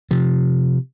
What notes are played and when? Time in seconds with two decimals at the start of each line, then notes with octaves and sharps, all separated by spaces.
0.11 C3 F3